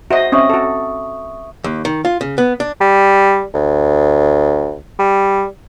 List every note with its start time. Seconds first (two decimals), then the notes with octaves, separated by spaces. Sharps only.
0.11 F#4 C5 D#5 E5
0.32 C4 C#4 D#5 E5 C#6 D#6
0.50 F#4 A4
1.64 D#2
1.85 D#3
2.05 F4
2.21 C#3
2.38 B3
2.60 D4
2.81 G3
3.54 D2
4.99 G3